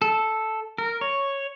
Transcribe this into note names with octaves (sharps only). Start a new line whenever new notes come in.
A4
A#4
C#5